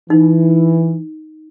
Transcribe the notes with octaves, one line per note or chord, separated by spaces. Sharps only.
E3 D#4